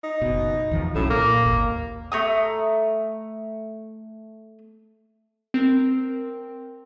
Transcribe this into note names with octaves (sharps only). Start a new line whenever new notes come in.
D#4
F#1 B2
E2 D#3 F3
B1 A2 F#3 C#4
A#2 A#3
G#1 D#2
A3 A#5 D#6
C4 A#4